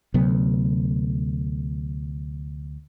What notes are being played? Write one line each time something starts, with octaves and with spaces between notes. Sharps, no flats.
D2 C3 F#3 B3